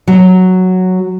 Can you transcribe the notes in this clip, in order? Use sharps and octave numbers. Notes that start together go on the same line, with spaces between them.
F#3